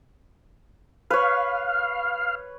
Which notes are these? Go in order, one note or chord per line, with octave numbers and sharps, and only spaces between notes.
B4 C#5 F5